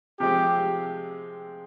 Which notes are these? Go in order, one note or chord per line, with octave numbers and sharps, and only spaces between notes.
C3 F3 G#3 C4 G4